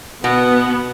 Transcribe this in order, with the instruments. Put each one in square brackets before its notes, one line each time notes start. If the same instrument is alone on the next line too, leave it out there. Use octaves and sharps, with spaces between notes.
[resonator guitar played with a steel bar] B2 [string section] B3 [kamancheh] F#5